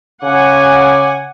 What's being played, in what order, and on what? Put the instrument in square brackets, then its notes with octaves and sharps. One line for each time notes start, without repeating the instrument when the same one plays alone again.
[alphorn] C#3 [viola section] F#5 G#5 [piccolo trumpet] D6